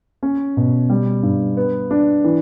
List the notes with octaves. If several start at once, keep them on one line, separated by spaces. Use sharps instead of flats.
C#4
B2
G3
G2
B3
D4
E3